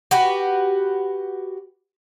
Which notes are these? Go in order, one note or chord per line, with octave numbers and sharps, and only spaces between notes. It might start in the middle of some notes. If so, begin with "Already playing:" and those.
F#4 G4 B4